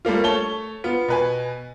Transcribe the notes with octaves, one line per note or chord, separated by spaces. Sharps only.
G3 A3 A#3 F4
A3 C#5 A5 G7
B3 F4
B2 B4 G#5